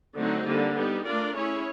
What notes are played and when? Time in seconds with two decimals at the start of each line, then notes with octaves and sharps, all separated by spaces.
0.16 D3 F#3 A3 C4 D#4
0.45 D3 G3 A#3
0.76 G3 B3 D#4 G4
1.06 A3 D4 F4 A#4 D5
1.35 C#4 E4 G#4 C#5